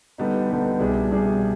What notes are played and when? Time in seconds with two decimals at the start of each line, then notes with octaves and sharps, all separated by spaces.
0.18 D3 G3 B3 D#4
0.49 D3 G3 B3 D#4
0.79 C2 B2 G3 D4 G#4
1.10 C2 B2 G3 D4 G#4